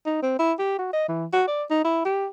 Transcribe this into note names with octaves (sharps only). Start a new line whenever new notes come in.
D#4
C4
E4
G4
F#4
D#5
E3
F#4
D5
D#4
E4
G4